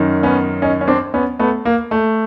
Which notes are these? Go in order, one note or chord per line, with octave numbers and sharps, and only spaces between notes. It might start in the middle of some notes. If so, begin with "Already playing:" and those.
Already playing: F#2 D#3
B3 C#4
C#4 D#4
C#4
C4 D4
B3 C#4
A3 B3
A#3
A3